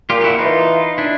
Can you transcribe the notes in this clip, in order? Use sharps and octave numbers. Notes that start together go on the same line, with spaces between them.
A#2 F4 G4
G4
E4 F#4
E3 D#4 F4
D4 E4